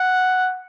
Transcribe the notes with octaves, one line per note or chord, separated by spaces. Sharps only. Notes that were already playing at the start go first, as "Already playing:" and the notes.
Already playing: F#5